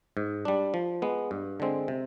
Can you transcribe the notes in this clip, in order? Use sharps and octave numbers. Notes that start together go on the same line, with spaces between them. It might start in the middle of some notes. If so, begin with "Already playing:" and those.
G#2
G3 D4
F3
G#3 B3
G2
D3 G#3 C4
C3